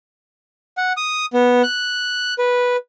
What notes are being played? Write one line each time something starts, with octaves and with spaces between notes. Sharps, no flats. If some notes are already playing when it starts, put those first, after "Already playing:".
F#5
D#6
B3
F#6
B4